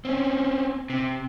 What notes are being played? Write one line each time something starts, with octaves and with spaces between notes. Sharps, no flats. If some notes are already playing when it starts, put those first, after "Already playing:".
C4 C#4
C3